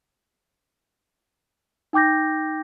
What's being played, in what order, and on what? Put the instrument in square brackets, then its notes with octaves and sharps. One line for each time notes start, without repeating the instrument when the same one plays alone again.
[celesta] D#4 G5 D6 G6 A#6